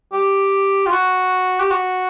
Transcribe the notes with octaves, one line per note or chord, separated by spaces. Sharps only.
G4
F4
F#4
G4
F#4